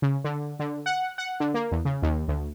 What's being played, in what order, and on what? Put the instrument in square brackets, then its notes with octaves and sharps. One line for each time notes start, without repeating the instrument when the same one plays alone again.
[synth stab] C#3
D3
D3
F#5
F#5
D3
A#3
E2
C#3
D#2
D2